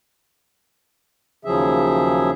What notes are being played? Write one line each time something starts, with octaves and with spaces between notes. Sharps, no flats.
D#2 C#3 F3 F#3 G#4 E5